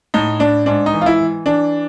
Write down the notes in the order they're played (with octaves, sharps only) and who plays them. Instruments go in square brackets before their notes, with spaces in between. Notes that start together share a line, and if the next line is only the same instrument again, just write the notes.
[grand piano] A2 D#4
A2 D4
G#2 D4
D#4
E3
F4
E4
E3
E3 D4